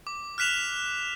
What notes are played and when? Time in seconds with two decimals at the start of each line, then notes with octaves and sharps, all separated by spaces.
0.07 D6
0.38 F6 F#6 B6 E7 F7